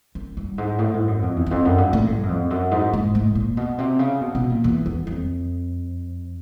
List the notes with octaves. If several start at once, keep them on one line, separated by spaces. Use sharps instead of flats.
F#2
G2
G#2
A2
G#2
F#2
F2
E2
E2
F2
F#2
G2
A2
G2
F#2
F2
F#2
G#2
G#2
A2
A#2
B2
C3
C#3
B2
B2
A#2
E2
E2
F2